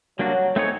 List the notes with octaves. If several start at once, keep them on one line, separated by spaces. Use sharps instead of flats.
F#3 G3 A#3 D4 F#4
A3 C4 D#4 G#4 C#5